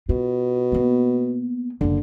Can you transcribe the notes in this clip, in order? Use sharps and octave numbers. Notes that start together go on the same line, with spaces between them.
B2 F4
A#3 B3
F#1 D3 A#3